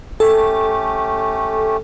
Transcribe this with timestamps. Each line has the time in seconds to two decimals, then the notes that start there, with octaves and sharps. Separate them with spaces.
0.20 A3 C#4 G4 A4